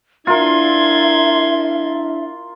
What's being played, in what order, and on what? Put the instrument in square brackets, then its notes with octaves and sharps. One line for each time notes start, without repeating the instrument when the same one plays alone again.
[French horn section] D4 E4 [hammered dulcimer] F4 A#4 [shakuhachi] E5 [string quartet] C6 G#6